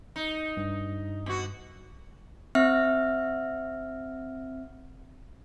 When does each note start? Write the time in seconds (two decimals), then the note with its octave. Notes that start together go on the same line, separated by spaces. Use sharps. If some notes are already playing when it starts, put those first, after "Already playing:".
0.16 D#4
0.57 G2
1.26 B2 F#4
2.55 C4 E5 F6